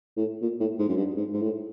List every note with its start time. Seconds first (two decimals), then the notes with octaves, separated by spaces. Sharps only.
0.17 A2
0.42 A#2
0.60 A2
0.79 G#2
0.89 F#2
0.97 G2
1.16 G#2
1.33 G#2
1.42 A2